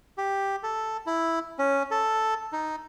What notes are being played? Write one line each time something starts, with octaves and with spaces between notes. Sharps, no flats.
G4
A4
E4
C#4
A4
D#4